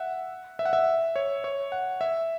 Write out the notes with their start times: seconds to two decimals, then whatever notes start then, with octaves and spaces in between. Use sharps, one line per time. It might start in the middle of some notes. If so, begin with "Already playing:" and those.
Already playing: E5 F#5
0.59 E5
0.65 F#5
0.73 E5
1.16 C#5
1.44 C#5
1.72 F#5
2.01 E5